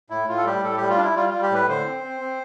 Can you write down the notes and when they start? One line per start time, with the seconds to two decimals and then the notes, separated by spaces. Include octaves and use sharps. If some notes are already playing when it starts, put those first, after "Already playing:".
0.10 A2 E4
0.28 A2 F4
0.37 A4
0.46 G3 G4
0.63 A2 A4
0.77 G3 G4
0.89 F4
0.98 D4
1.03 E4
1.16 G3 F4
1.29 G3 F4
1.42 G4
1.51 A2 B4
1.68 D3 C5
1.86 C4
2.04 C4
2.21 C4